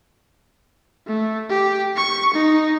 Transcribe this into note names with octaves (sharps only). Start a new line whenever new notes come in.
A3
G4
C#6
D#4